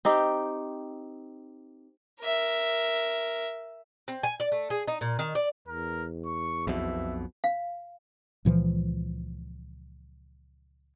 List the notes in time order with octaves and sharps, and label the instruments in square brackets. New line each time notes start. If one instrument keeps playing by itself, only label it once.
[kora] C4 D#4 G4
[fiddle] A#4 E5
[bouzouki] C4
G#5
D5
A3
G#4
D#4
A#2
D#3
D5
[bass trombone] E2 [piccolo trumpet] A#4
[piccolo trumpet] C#6
[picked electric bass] B1 F2 B2 [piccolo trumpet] E5
[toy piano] F5
[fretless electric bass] C#2 A#2 E3 F3